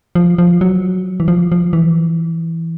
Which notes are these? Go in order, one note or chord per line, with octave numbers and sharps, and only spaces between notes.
F3
F3
F#3
E3
F3
F3
E3